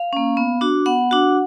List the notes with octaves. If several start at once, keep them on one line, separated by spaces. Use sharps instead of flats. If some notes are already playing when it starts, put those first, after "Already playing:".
Already playing: F5
A#3 C#4
B3
D4 F#4
B3 F#5
D4 F#4